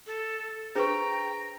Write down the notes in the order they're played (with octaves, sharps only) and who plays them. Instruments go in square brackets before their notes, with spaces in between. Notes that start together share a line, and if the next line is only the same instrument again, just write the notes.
[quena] A4
[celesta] D4 B4 C#6 [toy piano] G#4 C5 [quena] G5 [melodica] A#5